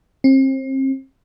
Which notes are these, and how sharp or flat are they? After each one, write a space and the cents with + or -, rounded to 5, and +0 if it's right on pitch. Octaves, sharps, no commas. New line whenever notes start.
C4 +35